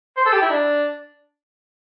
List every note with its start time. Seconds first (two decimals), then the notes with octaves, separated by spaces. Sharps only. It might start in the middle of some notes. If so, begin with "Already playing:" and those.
0.17 C5
0.26 A4
0.33 G4
0.42 E4
0.50 D4